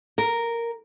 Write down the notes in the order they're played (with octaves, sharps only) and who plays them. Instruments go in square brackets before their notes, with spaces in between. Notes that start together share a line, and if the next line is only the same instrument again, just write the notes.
[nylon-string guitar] A#4